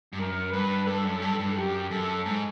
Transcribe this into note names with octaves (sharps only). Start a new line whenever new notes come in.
G2
F#2 A#4
G2 B4
G2 A4
F#2
G2
G2
F#2 G4
F#2 A4
G#2